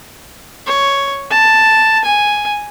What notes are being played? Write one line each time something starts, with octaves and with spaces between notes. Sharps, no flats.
C#5
A5
G#5